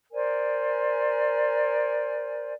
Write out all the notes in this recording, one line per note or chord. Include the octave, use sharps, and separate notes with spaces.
A#4 C5 D5 G#5